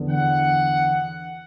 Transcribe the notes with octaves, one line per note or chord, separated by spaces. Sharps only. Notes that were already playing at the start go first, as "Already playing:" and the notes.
Already playing: E2 D3 B3
F#5